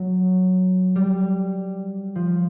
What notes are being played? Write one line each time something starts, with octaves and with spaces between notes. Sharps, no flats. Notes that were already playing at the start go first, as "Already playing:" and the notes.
Already playing: F#3
G3
F3